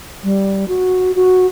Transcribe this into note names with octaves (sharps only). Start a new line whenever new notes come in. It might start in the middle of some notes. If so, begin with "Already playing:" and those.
G3
F#4
F#4